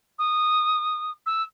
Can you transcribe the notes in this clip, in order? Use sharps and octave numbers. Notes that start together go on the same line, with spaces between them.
D#6
E6